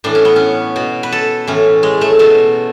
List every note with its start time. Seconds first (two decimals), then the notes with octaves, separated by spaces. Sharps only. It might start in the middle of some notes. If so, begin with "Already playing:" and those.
0.04 A2 E3 D4
0.15 C#4
0.25 B3
0.36 C#4
0.76 B2
1.03 B4
1.12 A4
1.47 A2 E3 C#4
1.83 G#3
2.01 A3
2.19 B2 A3